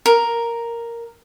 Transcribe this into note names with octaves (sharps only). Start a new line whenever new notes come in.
A#4